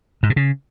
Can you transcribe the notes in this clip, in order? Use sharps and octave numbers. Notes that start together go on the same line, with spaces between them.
G#2
B2
C#3